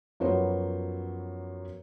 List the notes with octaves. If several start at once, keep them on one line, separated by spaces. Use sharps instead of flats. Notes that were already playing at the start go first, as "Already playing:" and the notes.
F#2 F3 F#3 B3 B4 C5